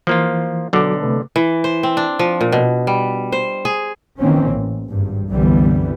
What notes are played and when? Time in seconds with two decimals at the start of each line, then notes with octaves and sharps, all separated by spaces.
0.07 E3 F3 A#3 F4
0.73 B1 D3 F#3 F#4 D6
1.02 C3 A3 B4
1.36 E3
1.64 C5
1.83 C4
1.97 D4
2.19 F3
2.41 A#2
2.52 B2
2.87 G3
3.32 C5
3.65 G#4
4.19 D#3 E3 A#3 C4 C#4
4.49 A1
4.89 G#1 G2
5.30 C2 F#2 D3 E3 G3 B3